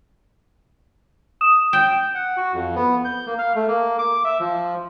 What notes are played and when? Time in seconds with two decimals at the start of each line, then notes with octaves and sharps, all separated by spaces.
1.41 D#6 E7
1.73 G5
2.15 F#5
2.37 F#4
2.54 F2
2.75 B3
3.05 G6
3.26 A#3
3.38 F5
3.55 A3
3.68 A#3
3.99 D6
4.24 E5
4.40 F3